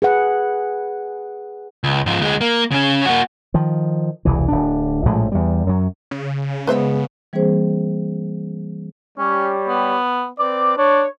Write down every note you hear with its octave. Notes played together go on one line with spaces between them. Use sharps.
G#4 B4 F#5
C#2
G#2 F3
D2 G#3
A#3
C#3 C#4
A#3 F#4
D#3 F3
E1 C2 E3
D1 D4
A#1 A2 F3 G#3
E2 G3
F#2 F#3
C#3
G#3 B3 B4 C5 E5
E3 G3 A#3 C4 G#4 C5
G3 C#4 G4 C#5
B3
C4 B4 D5 D6
D4 C#5